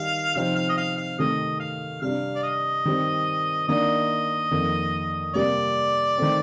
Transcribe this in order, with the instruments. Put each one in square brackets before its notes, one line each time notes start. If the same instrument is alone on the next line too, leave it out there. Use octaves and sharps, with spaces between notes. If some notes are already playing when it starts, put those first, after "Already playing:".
Already playing: [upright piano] D#3 G3 D#4 [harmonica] F5
[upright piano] C3 F3 C4 D#4 [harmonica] F5
[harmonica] F5
D#5
F5
F5
[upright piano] C3 D#3 A3 [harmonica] D#5
[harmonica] F5
[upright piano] C3 G3 D4 [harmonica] F5
[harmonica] D5
D#5
[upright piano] D#3 G3 C4
[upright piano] D#3 A#3 D4 [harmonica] D#5
[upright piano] F2 D#3 A#3
[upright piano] C3 G3 A#3 [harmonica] D5
[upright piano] D#3 A3 C4